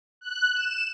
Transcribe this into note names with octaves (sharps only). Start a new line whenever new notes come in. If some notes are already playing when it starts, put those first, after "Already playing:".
F#6
E7